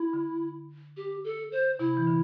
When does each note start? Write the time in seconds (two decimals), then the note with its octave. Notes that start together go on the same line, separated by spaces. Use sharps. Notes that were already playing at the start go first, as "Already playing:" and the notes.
Already playing: E4
0.13 D3
0.97 G4
1.24 A4
1.52 C5
1.79 C3 E4
1.97 E3
2.07 D3